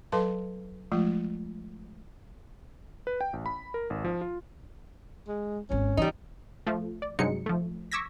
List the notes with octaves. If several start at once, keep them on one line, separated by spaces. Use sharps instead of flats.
F#3 A4 B4 F5 A5 C6
F3 G#3 A3 F4
B4
G5
A1
B5
A#4
G#1
F3
F4
G#3
G#1 D#2 C#4
E3 G3 D#4
F3 A3
D5
G2 C3 F#3 G#3 D#4 C#7
F3 A3
C#6 D6 E6 G#6 A#6 B6